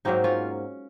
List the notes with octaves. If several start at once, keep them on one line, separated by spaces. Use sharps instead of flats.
G#2 F#3 A#3 C4 D#4
C#4 F4